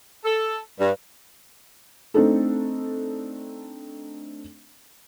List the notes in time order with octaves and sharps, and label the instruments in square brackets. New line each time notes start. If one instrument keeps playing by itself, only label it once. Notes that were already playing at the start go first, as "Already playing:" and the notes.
[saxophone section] A4
G2
[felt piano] A3 C4 D4 D#4 A4